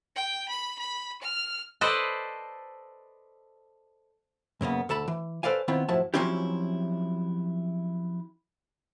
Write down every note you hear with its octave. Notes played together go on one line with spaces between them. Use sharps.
G5
B5
B5
F6
A4 B4 C5 D5 D#5
F#2 C#3 A#3 B3
D2 A4 A5 B5
E3
A4 B4 C5 D5 F5 G#5
D#3 B3 C4 E4 F4
F#2 A2 F3 E4 A5
F3 F#3 C4 C#4 E4 G4